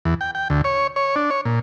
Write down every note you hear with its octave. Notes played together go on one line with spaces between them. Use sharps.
E2
G5
G5
D2
C#5
C#5
D4
C#5
A#2